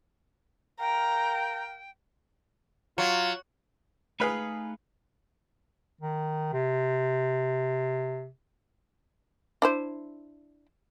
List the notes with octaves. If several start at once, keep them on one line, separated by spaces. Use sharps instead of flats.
A#4 F5 G5 A#5
F#3 F4
A3 D#4 G#4 B4 F5 B5
D#3
C3
D4 E4 C5